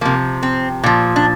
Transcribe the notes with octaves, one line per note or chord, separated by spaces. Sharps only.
C3 F3 A#3
C4
A#2 F3
D4